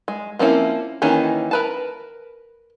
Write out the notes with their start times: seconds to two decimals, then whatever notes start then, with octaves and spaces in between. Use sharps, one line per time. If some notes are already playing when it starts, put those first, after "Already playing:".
0.08 G#3
0.39 F3 A#3 C4 C#4 E4
1.02 D#3 E3 A#3 C#4
1.51 A#4 B4 A5